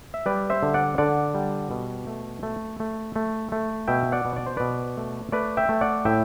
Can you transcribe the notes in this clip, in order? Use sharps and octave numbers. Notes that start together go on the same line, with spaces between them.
E5
G3 B4 D5
C5 E5
D3
D5 F#5
D3 D5 F#5
G3
B2
A3
A3
A3
A3
A3
B2 E5 G5
D5 F#5
B2
D5
C5
B2 B4 D5
A3
A3 B4 D5
E5 G5
A3
D5 F#5
A2 E5 G5